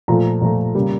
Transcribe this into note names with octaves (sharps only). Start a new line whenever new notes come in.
A#2 F3 A3 A#5
A#2 F3 A3
C#3 G3 A#3